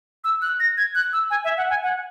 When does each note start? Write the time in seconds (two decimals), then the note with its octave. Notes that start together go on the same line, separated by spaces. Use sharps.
0.24 E6
0.42 F#6
0.60 A#6
0.77 G#6
0.95 F#6
1.13 E6
1.30 G#5
1.44 E5
1.57 F#5
1.70 G#5
1.84 F#5